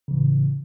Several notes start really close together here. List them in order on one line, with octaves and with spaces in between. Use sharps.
C#3 E3 A2